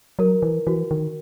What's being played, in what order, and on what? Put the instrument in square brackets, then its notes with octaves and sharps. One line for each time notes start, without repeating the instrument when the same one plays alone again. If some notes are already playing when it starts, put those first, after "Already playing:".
[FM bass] F#3 [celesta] A#4
[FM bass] E3
[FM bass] E3 [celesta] F#4
[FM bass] D#3